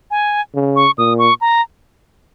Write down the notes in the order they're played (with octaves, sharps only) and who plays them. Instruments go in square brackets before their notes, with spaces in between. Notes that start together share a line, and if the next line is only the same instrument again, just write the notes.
[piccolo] G#5
[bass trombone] C#3
[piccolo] C#6
[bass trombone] A#2 [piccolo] D#6
[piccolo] C#6
A#5